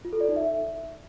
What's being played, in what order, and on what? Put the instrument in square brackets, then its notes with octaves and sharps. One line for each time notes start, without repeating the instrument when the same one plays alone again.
[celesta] F4
A4
D5
D#4
E5